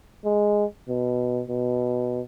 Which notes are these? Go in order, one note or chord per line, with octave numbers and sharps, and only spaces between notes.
G#3
B2
B2